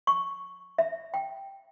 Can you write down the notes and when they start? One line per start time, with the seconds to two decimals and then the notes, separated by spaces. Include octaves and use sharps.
0.07 C#6
0.78 E5
1.14 G5